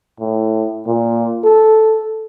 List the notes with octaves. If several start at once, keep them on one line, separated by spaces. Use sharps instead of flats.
A2
A#2
A4